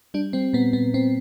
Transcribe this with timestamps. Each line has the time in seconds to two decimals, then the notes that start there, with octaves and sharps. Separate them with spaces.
0.14 G3 D4
0.33 G3 C4
0.53 A#2 B3
0.73 A#2 B3
0.94 A#2 C4